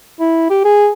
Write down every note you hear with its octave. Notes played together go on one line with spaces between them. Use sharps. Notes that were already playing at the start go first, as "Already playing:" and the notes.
E4
G4
G#4